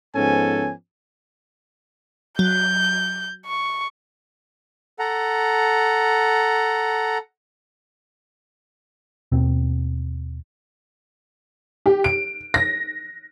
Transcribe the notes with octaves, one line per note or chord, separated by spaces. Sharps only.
G#2 F3 B3 C#4 A4 G#5
F#3 G6
C#6
A4 F#5 A#5
D#2 B2 C4
G4
D7
A#6